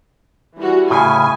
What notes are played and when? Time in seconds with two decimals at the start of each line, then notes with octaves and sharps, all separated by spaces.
0.57 E3 G3 F#4
0.90 A2 C#3 G#5